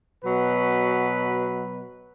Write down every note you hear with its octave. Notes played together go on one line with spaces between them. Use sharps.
B2 F#3 B4